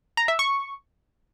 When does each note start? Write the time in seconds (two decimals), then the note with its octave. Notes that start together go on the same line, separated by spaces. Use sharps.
0.17 A#5
0.28 E5
0.39 C#6